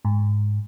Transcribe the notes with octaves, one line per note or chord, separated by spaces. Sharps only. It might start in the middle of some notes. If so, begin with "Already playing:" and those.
G#2